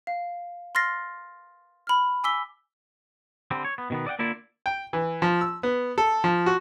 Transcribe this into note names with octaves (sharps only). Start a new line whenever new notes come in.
F5
C6 F6 A6 A#6 C7
B5 F6
G#5 D6 E6 B6 G7
D3 G3 C4
C#5
B3
B2 D#3 B3
D5 D#5 F#5 G5
D3 A#3 E4 F4 D5
G5
E3
F3
E6
B3
A4
F3
F#4